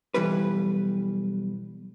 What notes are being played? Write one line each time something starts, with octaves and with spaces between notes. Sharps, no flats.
B1 E3 G3 B4